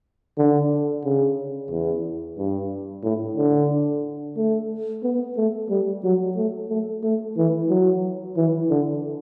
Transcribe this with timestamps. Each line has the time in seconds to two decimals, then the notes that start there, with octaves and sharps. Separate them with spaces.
0.38 D3
1.05 C#3
1.70 E2
2.38 G2
3.03 A2
3.37 D3
4.37 A3
5.03 B3
5.37 A3
5.69 G3
6.04 F#3
6.36 A3
6.69 A3
7.03 A3
7.37 E3
7.69 F#3
8.37 E3
8.70 D3